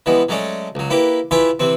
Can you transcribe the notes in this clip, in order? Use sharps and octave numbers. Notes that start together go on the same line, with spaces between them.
E3 G3 G#3 B3
F#3 G#3 A3 C#4 D5
C#2 F#3
A#3 E4 G4 B4
E4 F4 G4 B4 E5 G#5
C3 E3 C4